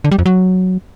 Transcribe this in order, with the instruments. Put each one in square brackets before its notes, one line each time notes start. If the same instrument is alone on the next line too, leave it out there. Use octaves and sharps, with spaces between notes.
[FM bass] D3
G3
F2
F#3